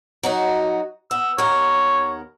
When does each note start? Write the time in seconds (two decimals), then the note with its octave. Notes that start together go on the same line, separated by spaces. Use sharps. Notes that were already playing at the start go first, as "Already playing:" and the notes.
0.23 F#3 D#4 F#4
1.11 B3 E6
1.38 D#2 B3 A#4 C#5